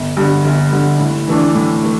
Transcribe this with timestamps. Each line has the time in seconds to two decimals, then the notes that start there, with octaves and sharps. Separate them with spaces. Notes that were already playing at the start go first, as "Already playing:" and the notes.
Already playing: G1
0.17 G2 D3
0.44 G1
0.72 G2 D3
1.00 A2
1.28 E3 A3 D4
1.55 A2
1.83 E3 A3